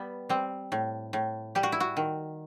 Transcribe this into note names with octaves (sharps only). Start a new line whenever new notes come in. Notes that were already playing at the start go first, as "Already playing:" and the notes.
Already playing: G3 B3
G3 C4
A2
A2
G3 G4
F#4
E4
F#4
D#3